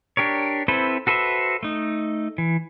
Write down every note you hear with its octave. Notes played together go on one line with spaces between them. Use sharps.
D4 G4 A#4 C#5
C4 E4 A4 B4 C5
F#4 A4 B4 C5 E5
A3 D#4
E3